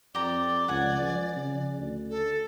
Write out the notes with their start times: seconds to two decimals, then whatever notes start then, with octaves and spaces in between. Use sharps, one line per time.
0.15 F2 G4 D5 A#5
0.68 C#2 F#5 G#5
1.00 F3
1.36 C#3
1.78 D2
2.10 A4